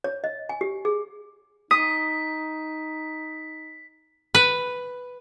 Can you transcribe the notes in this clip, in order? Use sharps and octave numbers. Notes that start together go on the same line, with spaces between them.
C#5
D#5
G#5
G4
G#4
D#4 D#6 B6
B4